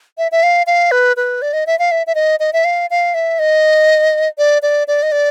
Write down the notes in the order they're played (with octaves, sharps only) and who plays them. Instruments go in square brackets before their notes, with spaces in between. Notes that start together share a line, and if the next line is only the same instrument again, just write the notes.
[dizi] E5
E5
F5
F5
B4
B4
D5
D#5
E5
F5
E5
E5
D#5
D#5
E5
F5
F5
E5
D#5
D5
D5
D5
D#5
D5